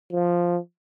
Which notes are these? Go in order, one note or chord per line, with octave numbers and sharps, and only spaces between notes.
F3